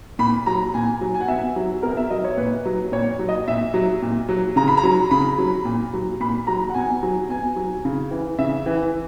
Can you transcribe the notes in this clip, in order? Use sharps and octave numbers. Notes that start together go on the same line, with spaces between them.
A#2 B5
F#3 A#5
A#2 G#5
F#3
G#5
F#5
B2 E5
F#3
B2 A#4
E5
F#3 D#5
C#5
A#2 B4
F#3
A#2 C#5
F#3
D#5
A#2 E5
F#3
A#2
F#3
C#3 A#5
B5
A#5
F#3
C#3 B5
F#3
A#2
F#3
A#2 B5
F#3 A#5
F#5
B2 G#5
F#3
B2 G#5
F#3
C#3
E3
C#3 E5
E3